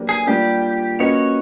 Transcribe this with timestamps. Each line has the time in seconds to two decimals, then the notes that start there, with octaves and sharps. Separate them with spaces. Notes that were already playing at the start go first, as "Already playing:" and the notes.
Already playing: F#3 A#3 D4 G4 B4
0.09 G#4
0.26 G3 A#3 D4 F4 G4
0.99 A#3 C#4 F#4 B4 C#5 D#5